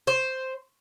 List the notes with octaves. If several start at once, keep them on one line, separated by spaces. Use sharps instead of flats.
C5